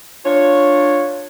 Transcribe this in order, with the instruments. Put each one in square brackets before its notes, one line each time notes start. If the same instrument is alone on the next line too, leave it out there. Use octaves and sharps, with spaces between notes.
[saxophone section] D4 F4 C#5